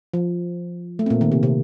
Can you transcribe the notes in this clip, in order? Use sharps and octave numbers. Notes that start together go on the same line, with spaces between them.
F3
A3
C4
A#2 A#3
D#3
C3
C3